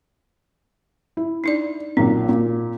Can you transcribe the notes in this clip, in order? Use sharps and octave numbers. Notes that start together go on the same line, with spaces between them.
E4
D4 D#4 D5
B1 A#2 C4
A#2